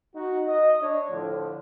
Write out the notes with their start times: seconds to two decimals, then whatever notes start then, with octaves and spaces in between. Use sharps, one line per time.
0.15 D#4 F#4
0.46 D#5
0.81 D4 C#5
1.10 A2 D3 F3